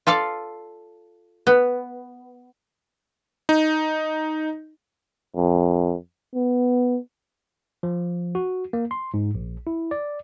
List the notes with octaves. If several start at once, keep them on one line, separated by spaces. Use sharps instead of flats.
F4 A4 D5 F5
B3
D#4
F2
B3
F3
F#4
A#3
C6
G#2
A#1
E4
D5